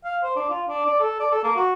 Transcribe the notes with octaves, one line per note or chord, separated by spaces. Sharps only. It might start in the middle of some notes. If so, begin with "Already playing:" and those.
F5
C5
D4
F4
D4
D5
A4
D5
A4
A#3
F#4